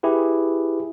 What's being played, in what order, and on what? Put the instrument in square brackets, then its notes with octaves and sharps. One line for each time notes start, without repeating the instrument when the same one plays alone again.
[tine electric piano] E4 G4 G#4 B4